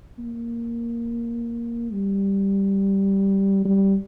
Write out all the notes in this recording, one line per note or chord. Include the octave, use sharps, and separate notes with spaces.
A#3
G3
G3